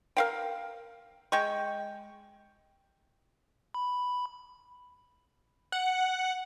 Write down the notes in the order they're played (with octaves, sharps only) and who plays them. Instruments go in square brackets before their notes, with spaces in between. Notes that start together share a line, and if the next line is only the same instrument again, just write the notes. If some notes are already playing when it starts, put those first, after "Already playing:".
[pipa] A#4 F5 G5
G#3 G5 C#6
[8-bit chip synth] B5
[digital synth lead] F#5